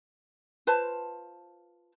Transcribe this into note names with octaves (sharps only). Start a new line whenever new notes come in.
F4 B4 C5 A5